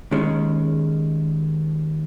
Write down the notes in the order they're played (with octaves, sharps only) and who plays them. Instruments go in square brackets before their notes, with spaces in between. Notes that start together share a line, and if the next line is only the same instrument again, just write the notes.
[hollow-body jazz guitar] D#2 D#3 G#3 C#4